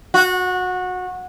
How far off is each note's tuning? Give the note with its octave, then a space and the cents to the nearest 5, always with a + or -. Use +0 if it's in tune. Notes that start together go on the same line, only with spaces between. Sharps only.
F#4 -20